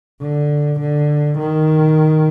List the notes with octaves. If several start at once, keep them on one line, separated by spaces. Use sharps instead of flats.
D3
D3
D#3